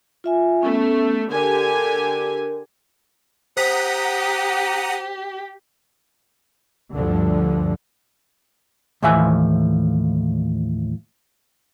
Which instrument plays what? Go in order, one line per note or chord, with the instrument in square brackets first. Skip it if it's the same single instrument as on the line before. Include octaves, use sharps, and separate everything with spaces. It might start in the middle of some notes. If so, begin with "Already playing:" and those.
[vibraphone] F4 E5 G#5
[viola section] A3 [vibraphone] B3 C#4
[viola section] D3 G4 G#5 [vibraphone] A#4
[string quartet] G4 [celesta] C5 B6 [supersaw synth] F#5 A#5 D#6
[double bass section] D2 G2 D3 F3
[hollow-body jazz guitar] D#2 A2 E3 F3 E5 G#5